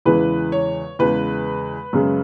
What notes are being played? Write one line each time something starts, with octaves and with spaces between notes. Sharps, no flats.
E2 C#3 E3 G#3 B4
C#5
E2 C#3 G#3 B4
F#2 C#3 G#3